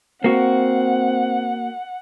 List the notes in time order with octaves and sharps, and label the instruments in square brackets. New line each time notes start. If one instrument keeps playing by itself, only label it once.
[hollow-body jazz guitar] A#3 F#4 [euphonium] C4 [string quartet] F#5